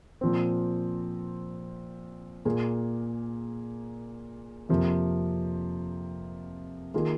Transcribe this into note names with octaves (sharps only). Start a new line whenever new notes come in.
A#2 F3 C4
A#2 A#3 G#4
F2 C3 F3 A#3
D#3 A#3 F4 G#4